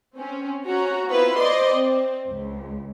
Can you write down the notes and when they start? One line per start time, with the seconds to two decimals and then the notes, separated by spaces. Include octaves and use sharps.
0.17 C4 C#4
0.65 C#4 F#4 A#5
1.08 B3 C4 E4 F4 B4
1.40 C5 D5 D#5 C6 D6
1.74 C4
2.29 C#2